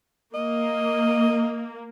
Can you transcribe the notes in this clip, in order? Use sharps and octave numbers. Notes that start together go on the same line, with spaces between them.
A#3 D#5